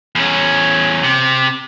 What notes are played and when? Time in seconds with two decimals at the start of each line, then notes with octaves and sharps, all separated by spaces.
0.15 E2 C#4
1.03 C3